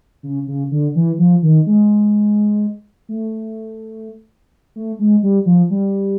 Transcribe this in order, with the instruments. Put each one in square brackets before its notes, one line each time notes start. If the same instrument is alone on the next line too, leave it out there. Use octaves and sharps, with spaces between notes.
[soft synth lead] C#3
C#3
D3
E3
F3
D#3
G#3
A3
A3
G#3
G3
F3
G3